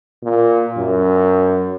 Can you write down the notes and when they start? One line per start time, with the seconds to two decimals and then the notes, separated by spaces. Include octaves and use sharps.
0.23 A#2
0.78 F#2